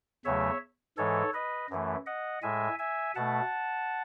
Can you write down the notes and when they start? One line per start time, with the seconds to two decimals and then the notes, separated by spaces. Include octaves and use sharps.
0.25 E2 C#3 F#3 A3 C#5 E5
0.98 G#2 E3 G#3 A4 C#5
1.34 B4 D#5
1.70 F#2 E3 A3
2.06 D#5 F#5
2.42 A2 G#3 E5 G#5
2.79 E5 G#5
3.15 B2 A3 F#5 A5